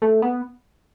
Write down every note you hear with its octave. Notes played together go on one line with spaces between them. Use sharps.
A3
B3